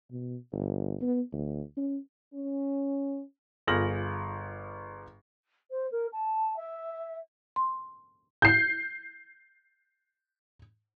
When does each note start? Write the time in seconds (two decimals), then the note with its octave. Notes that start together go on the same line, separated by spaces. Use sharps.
0.11 B2
0.52 G1
1.01 B3
1.33 D2
1.77 C#4
2.34 C#4
3.67 G1 F4 G#4 F6 A#6 F#7
5.70 C5
5.91 A#4
6.12 A5
6.56 E5
7.56 C6
8.42 G6 C7